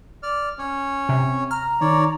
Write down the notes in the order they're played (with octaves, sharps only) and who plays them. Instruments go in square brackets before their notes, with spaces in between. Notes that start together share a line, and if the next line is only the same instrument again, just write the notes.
[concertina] D5 F6
C#4 C#5
[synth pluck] C3
[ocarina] A#5 [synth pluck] F6
[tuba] D#3 [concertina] C#5 D5